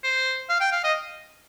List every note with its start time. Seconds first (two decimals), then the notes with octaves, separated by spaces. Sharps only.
0.03 C5
0.49 F5
0.61 G5
0.72 F5
0.84 D#5